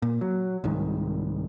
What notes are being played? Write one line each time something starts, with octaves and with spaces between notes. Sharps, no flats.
A#2
F#3
C2 G#2 D#3